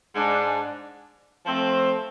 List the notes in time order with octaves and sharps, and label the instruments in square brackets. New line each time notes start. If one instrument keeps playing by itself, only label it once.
[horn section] G#2 G#3 D4
F3 A3 C4